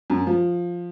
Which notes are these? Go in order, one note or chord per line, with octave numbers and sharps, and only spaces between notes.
F#2
F3